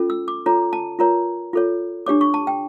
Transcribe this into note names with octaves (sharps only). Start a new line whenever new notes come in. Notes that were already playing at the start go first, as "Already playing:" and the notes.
Already playing: C#4 F4 A4
E6
D6
F4 A4 C#5 A#5
A5
F4 A#4 C#5 A#5
F4 A4 C#5
D4 G4 C#5 D6
C#6
A5
G5